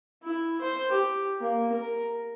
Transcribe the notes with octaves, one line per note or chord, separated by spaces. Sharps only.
E4
C5
G4
A#3
A#4